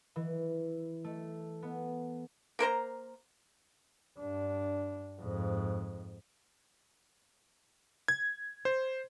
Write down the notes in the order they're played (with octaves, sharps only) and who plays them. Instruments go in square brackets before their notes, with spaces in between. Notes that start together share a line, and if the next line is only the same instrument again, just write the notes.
[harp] E3
A3
B3
[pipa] A#3 A#4 C5 A#5
[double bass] G2 D4
F2 G#2
[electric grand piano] G#6
C5